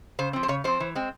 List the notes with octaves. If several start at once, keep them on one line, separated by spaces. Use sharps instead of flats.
C#3 C5
F3 C4
C5
C#3 C#5
F3 C4 C5
E3
G#3 C4